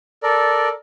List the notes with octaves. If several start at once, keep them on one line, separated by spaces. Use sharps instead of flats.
A4 A#4 D5